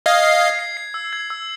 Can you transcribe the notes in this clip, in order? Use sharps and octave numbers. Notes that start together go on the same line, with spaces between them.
D#5 F5 G#6
C7
G#6
C7
C7
E6
G#6
E6